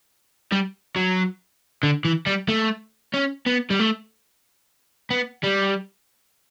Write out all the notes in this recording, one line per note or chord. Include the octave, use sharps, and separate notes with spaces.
G3
F#3
D3
E3
G3
A3
C#4
B3
G3
A3
B3
G3